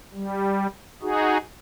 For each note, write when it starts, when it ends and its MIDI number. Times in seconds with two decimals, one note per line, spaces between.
0.14 0.67 55
1.02 1.38 63
1.02 1.38 66
1.02 1.38 68